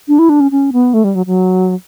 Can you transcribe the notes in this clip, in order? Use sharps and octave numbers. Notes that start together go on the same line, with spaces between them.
D4
E4
D4
C#4
C#4
B3
A3
G3
F#3
F#3